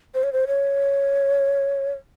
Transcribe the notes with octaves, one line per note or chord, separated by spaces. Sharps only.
C5
C#5
C5
C#5